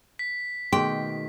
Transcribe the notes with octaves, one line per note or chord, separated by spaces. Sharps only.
B6
B2 D#3 A3 F#4 G#4 G5 C6